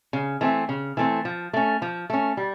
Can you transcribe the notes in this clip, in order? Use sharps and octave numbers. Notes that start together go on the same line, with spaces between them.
C#3
E3 A3 C4
C#3
E3 A3 C4
F3
A3 C#4
F3
A3 C#4
G3